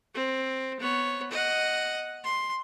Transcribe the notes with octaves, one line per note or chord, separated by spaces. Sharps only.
C4
B3 C#5
D#5 F#5
C6